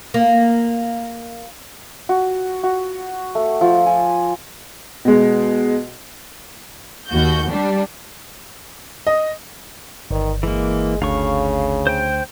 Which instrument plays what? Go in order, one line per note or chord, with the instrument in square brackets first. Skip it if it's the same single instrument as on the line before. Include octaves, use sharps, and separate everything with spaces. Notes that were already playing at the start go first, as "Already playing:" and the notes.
[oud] A#3
[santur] F#4
F#4
A3
F3
G#5
[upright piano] B2 G#3
[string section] D#2 F#4 G6
G3 D4
[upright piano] D#5
[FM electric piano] G1 [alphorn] D#3
[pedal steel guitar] E3 A#3 [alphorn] G#3
[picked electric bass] D2 [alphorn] C#3 [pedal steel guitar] F5 C#6
[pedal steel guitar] C5 G5